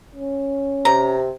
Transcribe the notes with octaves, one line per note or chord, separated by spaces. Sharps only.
C#4
C3 A#5